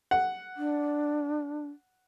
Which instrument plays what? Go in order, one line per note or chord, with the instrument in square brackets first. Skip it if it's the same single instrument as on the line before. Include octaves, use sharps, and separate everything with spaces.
[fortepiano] F#5
[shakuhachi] D4